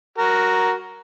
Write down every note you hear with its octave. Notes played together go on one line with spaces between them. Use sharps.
F#4 A#4